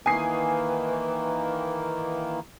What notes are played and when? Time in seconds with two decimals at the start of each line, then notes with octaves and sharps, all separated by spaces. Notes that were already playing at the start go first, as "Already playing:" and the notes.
0.06 D#3 E3 A#3 B4 G#5 D#6 C7